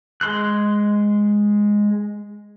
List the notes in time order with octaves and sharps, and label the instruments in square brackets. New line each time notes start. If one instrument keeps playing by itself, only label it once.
[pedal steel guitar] G#3 C6 F#6